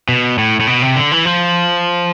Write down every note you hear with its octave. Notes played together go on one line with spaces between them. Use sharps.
B2
A2
A2
B2
C3
D3
E3
F3